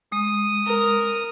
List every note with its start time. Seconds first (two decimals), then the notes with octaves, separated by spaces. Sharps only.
0.12 G#3 D#6
0.66 A#4